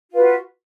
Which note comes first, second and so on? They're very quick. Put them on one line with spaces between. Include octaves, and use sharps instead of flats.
F4 B4 F#4